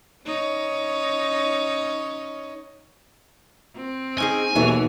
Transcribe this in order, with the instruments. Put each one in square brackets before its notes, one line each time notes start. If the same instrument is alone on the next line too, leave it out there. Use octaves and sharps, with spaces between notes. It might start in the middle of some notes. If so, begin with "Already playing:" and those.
[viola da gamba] C#4 D#4 C#5
C4
[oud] C#4 D#4 G#4 [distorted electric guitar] G#5
[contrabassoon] D#2 [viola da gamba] B2 E3 [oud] F#3 A4 E5